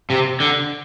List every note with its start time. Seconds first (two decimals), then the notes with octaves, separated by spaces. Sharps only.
0.10 C3
0.40 D3